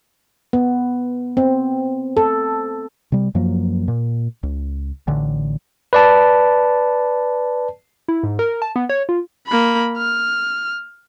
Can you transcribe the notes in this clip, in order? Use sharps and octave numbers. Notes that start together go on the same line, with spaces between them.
B3
C4
A4
C3 G3
F#2 F3 F#3 A#3
A#2
C#2
A1 D3
B4 D5 A5
E4
G#2
A#4
A5
B3
C#5
F4
A#3 B5
F6